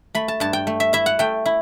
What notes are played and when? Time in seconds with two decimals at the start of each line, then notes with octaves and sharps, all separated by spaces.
0.15 A3 B5
0.28 A5
0.40 G2 A5
0.53 G5
0.67 A3
0.80 E5
0.93 E4 E5
1.06 F#5
1.19 A3 G5
1.46 E4